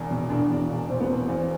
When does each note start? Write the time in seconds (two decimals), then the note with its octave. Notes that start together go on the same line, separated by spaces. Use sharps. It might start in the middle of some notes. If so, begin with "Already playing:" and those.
Already playing: E1 E2
0.11 B2
0.30 E1 D4
0.50 E2
0.70 E1
0.89 B2 C4
1.01 B3
1.09 E1 C4
1.28 E2